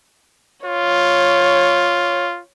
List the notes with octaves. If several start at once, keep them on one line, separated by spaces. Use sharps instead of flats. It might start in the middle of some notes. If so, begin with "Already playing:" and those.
F4 C#5